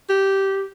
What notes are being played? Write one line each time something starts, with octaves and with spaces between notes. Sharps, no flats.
G4